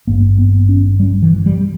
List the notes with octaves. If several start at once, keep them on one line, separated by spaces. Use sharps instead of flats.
G#1 G2 A#3
B3
C#4
G3
E3
G3